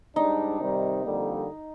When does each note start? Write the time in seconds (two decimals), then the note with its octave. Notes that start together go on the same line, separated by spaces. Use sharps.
0.16 G#2 G3 D4 D#4
0.60 C3 D#3 G3
1.03 F2 D3 G3 A#3